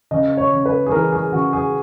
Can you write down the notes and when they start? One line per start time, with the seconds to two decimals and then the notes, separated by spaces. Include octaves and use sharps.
0.11 C#3 D#5
0.38 C#5
0.52 C#3
0.66 B4
0.86 G#4
0.92 E3 A#4
1.12 G#4
1.32 C#3 F#4
1.53 G#4